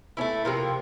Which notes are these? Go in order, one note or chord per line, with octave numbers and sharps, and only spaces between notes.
A3 C#4 E4
C3 F3 A#3